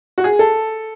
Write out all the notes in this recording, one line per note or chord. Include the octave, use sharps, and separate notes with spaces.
F#4
G#4
A4